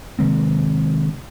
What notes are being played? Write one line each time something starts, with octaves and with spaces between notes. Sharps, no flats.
C3 D#3 G#3 C4